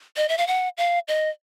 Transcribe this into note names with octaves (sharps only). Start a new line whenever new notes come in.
D#5
E5
F5
F#5
F5
D#5